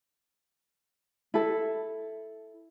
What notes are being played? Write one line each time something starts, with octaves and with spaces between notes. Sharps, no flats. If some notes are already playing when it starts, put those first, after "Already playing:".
E4 A4